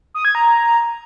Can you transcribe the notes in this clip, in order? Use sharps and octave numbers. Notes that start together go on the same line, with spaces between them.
D#6
G#6
A#5